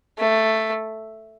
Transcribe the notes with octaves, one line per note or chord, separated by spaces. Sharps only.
A3